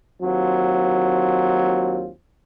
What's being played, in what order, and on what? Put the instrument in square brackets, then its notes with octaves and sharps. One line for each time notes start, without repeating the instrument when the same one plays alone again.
[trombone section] D#2 F#3 C4 F4